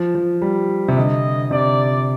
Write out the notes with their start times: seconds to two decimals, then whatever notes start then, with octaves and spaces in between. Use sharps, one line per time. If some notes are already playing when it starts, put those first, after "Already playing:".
Already playing: F3
0.15 F3
0.42 G3
0.88 C3
0.96 D3 D#5
1.51 C3 D5